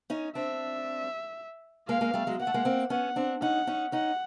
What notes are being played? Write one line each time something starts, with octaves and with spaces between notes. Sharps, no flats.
C#4 D#4
C4 D4 E5
G#3 A#3 F5
G#3 A#3
G3 A3
F#3 G#3
A#3 F#5
A3
G#3 A#3
A#3 C4
B3 C#4 F#5
C4 D4
C#4 D#4 F#5
C#4 D#4
C#4 D#4 F#5